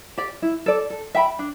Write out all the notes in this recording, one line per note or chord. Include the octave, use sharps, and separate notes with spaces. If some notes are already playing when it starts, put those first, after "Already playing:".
G4 D5
E4
A4 D5
A4
E5 G5 B5
D4